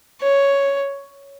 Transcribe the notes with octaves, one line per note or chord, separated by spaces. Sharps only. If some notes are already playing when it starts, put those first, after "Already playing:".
C#5